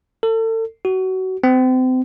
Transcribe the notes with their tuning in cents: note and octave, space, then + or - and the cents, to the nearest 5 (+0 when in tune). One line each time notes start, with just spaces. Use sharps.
A4 +35
F#4 +25
C4 -35